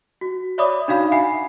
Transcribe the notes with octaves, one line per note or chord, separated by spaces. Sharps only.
F#4
C#5 D5 E5 B5 D6 D#6
D4 D#4 F#4 F5 B5
E5 F#5 G#5 B5 C7